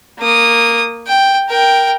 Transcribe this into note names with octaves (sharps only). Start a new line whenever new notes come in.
A#3 D#6
G5
A#4 G5